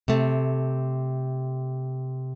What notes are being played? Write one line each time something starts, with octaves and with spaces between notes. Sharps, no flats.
C3 A3